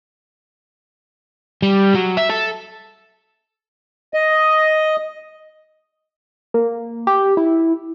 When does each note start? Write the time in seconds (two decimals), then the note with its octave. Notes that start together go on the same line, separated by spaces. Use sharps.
1.62 G3
1.95 F#3
2.17 E5
2.29 A4
4.14 D#5
6.54 A#3
7.07 G4
7.37 E4